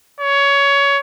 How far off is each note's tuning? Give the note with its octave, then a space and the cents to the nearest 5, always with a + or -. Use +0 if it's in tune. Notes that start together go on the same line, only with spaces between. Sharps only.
C#5 +20